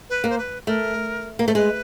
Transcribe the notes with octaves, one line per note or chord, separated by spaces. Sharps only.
B4
A#3
C5
B4
A3 A#4
A#3
A3 C5
G#3 B4